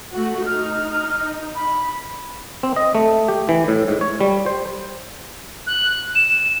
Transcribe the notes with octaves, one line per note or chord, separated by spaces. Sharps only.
A3 F#4
D#4 F6
B5
C4
D#5
A3
G4
E3
A2
G#2
C#5
G3
C5
F#6
E7